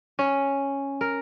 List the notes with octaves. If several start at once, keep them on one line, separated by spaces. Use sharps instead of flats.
C#4
A#4